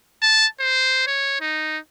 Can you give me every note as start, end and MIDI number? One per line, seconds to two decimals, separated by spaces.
0.22 0.46 81
0.60 1.05 72
1.07 1.39 73
1.41 1.78 63